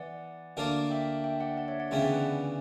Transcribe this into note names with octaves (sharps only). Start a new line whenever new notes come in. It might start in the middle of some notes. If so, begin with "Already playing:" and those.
Already playing: E3 B3 D5 F#5
D2 D3 A#3 D4 A#4
E5 G5
E5 G5
D5 F#5
D5 F#5
C#5 E5
D5 F#5
D2 C#3 E3 B3 E5 G5
D5 F#5
B4 D5